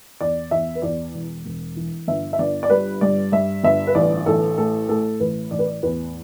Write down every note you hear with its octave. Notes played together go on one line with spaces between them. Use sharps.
E2 D5
E2 E5
B4
E2 D5
E1
E1
E3
G1 E5
E5
G1 D5
D5
G3 B4
G2 D5
G2 E5
G1 E5
B4
A1 D5
A1 A4
A2 A4
A2 A4
A1 B4
A1 D5
B4
D5
E2 B4